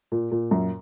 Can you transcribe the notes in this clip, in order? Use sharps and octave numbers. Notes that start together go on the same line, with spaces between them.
A#2
A#2
F#2